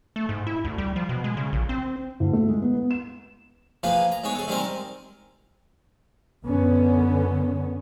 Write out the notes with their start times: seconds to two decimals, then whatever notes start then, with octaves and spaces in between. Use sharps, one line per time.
0.16 A3
0.29 G#2
0.47 E4
0.64 D2
0.78 G3
0.96 F3
1.09 B2
1.24 G#3
1.37 C#3
1.53 A#1
1.69 C4
2.20 D2
2.33 A3
2.49 G#3
2.62 B3
2.74 B3
2.91 E7
3.83 F3 A#3 F4 G#4 B4
4.12 A#5
4.24 G#2 B3 G#4 C#5
4.35 G#4 A4
4.48 D#3 G3 G#3 C4 A#4 D#5
6.44 F#2 D3 B3 C#4